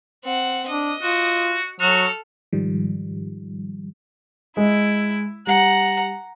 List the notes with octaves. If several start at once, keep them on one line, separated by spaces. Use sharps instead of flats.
C4 F#5
D4 D#5
F4 F#4
F#3 F#4 A4 F6
G#2 D#3 F3 G3
G#3 E4
G3 F#5 A#5